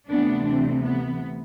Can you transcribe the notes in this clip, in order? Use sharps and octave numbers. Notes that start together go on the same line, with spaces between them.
D2 C3 E3 A3 B3 D4
A3 C4
B3